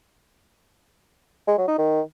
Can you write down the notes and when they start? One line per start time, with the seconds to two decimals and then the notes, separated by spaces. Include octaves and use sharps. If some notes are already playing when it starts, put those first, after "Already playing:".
1.47 G#3
1.58 F#3
1.68 D#4
1.78 D#3